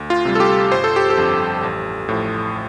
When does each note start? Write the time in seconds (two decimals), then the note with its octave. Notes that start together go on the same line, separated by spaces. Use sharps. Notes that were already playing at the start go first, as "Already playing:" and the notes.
Already playing: D2
0.10 F4
0.25 C3 G3
0.35 A4
0.40 G4
0.71 G1 C5
0.84 A4
0.96 G4
1.10 A4
1.17 F2 D3
1.63 A1
2.09 A2 F3